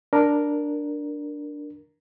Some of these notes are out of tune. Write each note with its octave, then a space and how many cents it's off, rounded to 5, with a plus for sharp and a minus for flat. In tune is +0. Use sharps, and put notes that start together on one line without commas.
D4 +0 A#4 +5